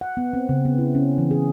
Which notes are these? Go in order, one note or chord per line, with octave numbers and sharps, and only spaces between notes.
F#5
B3
C4
C#3
B3
E4
C#4
E3
G#4